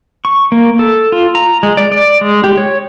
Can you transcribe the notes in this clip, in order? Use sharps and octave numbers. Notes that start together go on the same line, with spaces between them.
C#6
A#3
A4
F4
A#5
G#3
D5
D5
G#3
G4
C#5